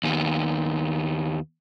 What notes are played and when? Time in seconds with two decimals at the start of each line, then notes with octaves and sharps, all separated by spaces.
0.03 D#2 B3